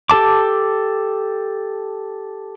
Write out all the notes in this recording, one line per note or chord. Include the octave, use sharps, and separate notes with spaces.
G4 A4 A5 D6